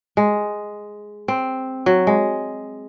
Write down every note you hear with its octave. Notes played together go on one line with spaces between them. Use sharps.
G#3
C4
F#3
G#3